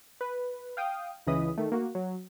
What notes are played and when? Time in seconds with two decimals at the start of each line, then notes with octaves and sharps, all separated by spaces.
0.21 B4
0.77 F5 G5 D#6
1.27 C#2 C#3 E3 D#5 B5 D#6
1.58 D#3 A3
1.72 A#3 F#4
1.95 F#3